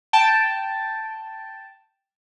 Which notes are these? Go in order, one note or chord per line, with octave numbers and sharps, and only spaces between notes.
G5 A5